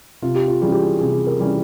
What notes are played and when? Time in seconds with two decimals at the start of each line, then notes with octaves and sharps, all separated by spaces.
0.22 C3 F4
0.35 G4
0.48 F4
0.61 E3 G3 C#4 G#4
0.72 G4
0.82 G#4
1.00 C3 G#4
1.27 A#4
1.39 E3 G3 C#4